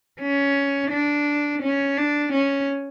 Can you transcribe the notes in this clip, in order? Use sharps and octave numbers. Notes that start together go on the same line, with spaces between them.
C#4
D4
C#4
D4
C#4